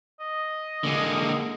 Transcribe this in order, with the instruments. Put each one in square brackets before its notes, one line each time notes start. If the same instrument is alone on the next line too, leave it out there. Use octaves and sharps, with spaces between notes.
[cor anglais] D#5
[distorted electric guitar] D3 G#3 [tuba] A#3